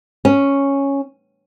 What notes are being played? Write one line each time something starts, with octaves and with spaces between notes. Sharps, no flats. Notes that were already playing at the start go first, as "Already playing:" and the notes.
C#4